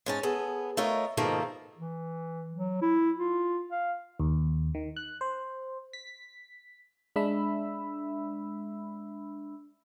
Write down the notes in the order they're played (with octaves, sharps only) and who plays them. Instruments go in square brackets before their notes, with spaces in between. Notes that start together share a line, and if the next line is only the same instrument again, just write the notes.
[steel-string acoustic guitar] G#2 C#4 A5
B3 G#4 A4
A3 F4 A#4 C#5 D#5
G#2 B2 D#3 F3 A3 A#3
[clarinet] E3
F#3
E4
F4
F5
[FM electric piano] D#2
D#3
F#6
C5
B6
G#3 D4 E5 B5 E6